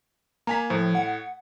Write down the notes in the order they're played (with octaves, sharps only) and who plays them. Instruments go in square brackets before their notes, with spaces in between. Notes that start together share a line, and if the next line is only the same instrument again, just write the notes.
[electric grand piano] A#3 G#5 B6 [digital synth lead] A#5
[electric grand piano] A2 [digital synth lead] F3
[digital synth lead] F#5